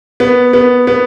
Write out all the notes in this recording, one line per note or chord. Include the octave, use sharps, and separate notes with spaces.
B3
B3
B3